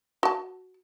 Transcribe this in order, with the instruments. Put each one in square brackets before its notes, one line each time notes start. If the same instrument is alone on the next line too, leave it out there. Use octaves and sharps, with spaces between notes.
[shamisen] F#4 A5